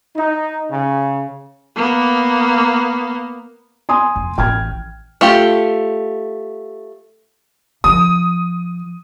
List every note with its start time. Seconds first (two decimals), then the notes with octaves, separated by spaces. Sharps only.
0.17 D#4
0.71 C#3
1.76 A#3 B3
3.89 G#5 C6 D#6
4.16 F2
4.38 A1 E3 G5 F6 G#6
5.21 A3 F4 G4
7.84 F3 D#6